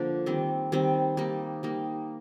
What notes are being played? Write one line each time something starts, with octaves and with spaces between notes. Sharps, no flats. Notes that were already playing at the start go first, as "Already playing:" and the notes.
Already playing: D3 F3 A#3 D4
D#3 G3 C4
D#3 G3 C4
G3 A#3 D#4
G3 A#3 D#4